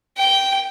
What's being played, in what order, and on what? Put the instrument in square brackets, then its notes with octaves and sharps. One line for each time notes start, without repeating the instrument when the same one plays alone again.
[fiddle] G5